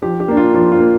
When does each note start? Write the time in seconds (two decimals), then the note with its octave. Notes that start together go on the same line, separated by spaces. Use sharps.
0.02 F3 G4
0.20 G4
0.28 A#3 D4
0.37 F4
0.54 F3 F4
0.72 F4
0.80 A#3